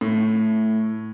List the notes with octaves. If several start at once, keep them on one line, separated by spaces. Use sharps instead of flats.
A2